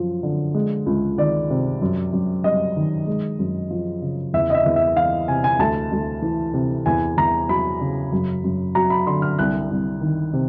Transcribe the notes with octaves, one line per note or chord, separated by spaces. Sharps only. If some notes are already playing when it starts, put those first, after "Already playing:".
Already playing: F#2 F3
D3
G#3
C#2
D#3 D5
C3
F#2
F#2
G3 D#5
D#3
G#3
F#2
F3
C#3
E2 E5
D#5
E5
E2
E5
E3 F5
C3 G#5
G#5
D2 A5
D2
E3
C3
E2 G#5
E2 A#5
F#3 B5
C#3
F#2
F#2
F#3 A#5
B5
D3 C6
F6
C2 F#6
C2
D#3
C3